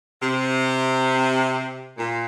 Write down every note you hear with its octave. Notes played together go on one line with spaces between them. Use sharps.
C3
A#2